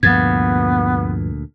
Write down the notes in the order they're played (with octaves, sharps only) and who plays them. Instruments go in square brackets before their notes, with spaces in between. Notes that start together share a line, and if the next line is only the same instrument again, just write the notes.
[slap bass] D2 A#2 [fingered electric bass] G2 F3 [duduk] B3 [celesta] G#6 A6